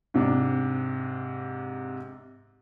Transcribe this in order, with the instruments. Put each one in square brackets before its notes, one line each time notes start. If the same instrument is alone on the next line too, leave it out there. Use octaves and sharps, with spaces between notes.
[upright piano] G#2 C3 D4